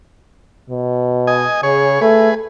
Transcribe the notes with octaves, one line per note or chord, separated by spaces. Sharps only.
B2
D#5 G#5
C#3 G#4 C#5
A3 G#4 B4